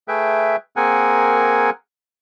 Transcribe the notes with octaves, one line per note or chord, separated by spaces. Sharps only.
A3 G#4 B4 E5 G5
A#3 C4 G#4 A#4 F#5 G#5